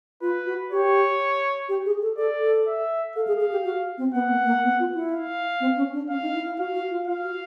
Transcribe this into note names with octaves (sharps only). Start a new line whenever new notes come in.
F4 B4
F#4
G4 C#5
G4
G#4
A4
A4 D5
A4
E5
A4 F5
G#4
G#4
G4
F#4
C4
B3 F#5
A#3
A#3
B3
F4
E4
F5
C4
C#4
D4
C#4 F5
D#4
E4
E4
F#4 F5
F#4
F4
F4 F5
F#4